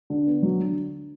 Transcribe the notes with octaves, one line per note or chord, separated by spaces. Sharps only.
D3
B3
F#3
D3